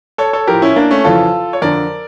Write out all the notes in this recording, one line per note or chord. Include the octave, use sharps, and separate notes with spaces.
A4 C#5
A4 C#5
A2 F3 G4 A#4
C#4 E4
A#3 D4
A3 C#4
F2 C#3 E3 F4 A4
C#5
F2 D3 F3 A#4 D5